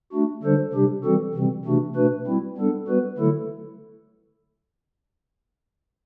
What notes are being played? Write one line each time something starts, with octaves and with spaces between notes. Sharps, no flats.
A3 D4 F#4
D3 G3 D4 A4 C5
C3 G3 D4 G4
E3 G3 C4 F#4 A4
C3 E3 G3 C4
C3 E3 A3 D4 F#4
B2 A3 D4 F#4 B4
G3 C4 E4
G3 B3 D4 A4
G3 B3 F#4 B4
D3 F#3 A3 E4 A4